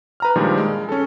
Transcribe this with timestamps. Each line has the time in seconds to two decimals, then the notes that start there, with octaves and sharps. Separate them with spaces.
0.20 B4 A#5 F6
0.35 G2 A#2 D#3 F3 G3 G#3
0.57 G#3
0.89 C#4 A4